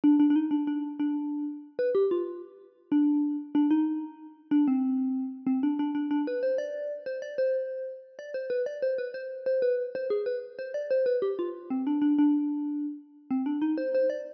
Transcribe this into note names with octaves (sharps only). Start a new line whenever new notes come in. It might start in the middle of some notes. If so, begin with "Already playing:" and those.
D4
D4
D4
D#4
D4
D4
D4
B4
G4
F4
D4
D4
D#4
D4
C4
C4
D4
D4
D4
D4
B4
C5
D5
C5
D5
C5
D5
C5
B4
D5
C5
B4
C5
C5
B4
C5
G#4
B4
C5
D5
C5
B4
G4
F4
C4
D4
D4
D4
C4
D4
D#4
C5
C5
D5